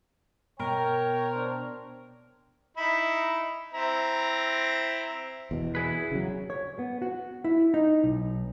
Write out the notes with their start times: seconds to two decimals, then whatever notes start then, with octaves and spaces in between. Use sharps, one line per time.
0.59 B2 A#4 C#5 G5
1.32 D4 C5
2.77 D#4 E4 B5
3.74 C4 E4 A#5
5.51 E2 B2
5.75 E4 G#4 B4
6.11 C#3 F#3
6.50 C#5
6.79 B3
7.02 F#4
7.44 E4
7.74 D#4
8.04 B1